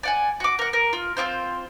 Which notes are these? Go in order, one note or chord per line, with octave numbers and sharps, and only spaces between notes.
D5 F#5 G#5
F#4 D6
A#4 F#5
A#4
F4
C4 E4 F4 C5